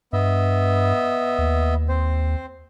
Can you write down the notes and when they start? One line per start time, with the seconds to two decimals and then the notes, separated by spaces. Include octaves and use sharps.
0.13 G2 B3 D#5 E5
1.38 D#2
1.89 C4 C5